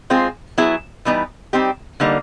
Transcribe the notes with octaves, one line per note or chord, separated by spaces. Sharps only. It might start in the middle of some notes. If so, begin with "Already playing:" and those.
G#3 C4 F4 G#4
F#3 B3 E4 G#4
E3 G3 B3 D#4
G3 C4 D#4 G4
D3 G3 A#3 D#4